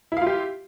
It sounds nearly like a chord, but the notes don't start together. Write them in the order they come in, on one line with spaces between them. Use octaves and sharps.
E4 F5 F4 G4